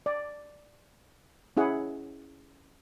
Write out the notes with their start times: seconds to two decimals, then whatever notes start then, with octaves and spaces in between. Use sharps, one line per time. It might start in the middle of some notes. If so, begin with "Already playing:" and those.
0.06 D5
1.57 C#4 E4 G#4 F#5